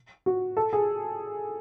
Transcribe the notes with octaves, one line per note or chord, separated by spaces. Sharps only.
F#4
A4
G#4